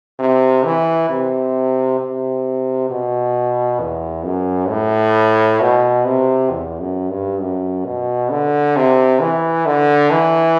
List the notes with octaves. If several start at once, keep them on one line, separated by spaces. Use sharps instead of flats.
C3
E3
C3
C3
B2
E2
F#2
A2
B2
C3
E2
F#2
G2
F#2
B2
D3
C3
E3
D3
E3